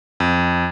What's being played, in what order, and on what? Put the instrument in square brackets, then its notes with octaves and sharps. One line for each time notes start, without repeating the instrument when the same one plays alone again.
[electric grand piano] F2